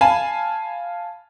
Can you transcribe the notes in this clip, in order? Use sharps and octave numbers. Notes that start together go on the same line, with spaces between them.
F5 G#5 A5 B5